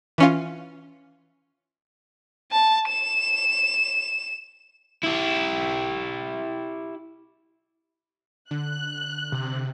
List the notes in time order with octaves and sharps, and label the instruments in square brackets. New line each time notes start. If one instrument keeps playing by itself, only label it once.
[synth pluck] E3 C#4 F4
[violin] A5
E7
[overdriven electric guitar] E4 G4
[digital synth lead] D3 [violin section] F#6
[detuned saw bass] C3